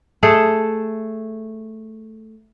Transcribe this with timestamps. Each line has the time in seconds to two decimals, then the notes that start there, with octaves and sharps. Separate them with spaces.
0.23 A3 G#4 A4